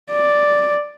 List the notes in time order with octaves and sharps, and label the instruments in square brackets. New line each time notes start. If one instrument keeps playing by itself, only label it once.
[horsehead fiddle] D5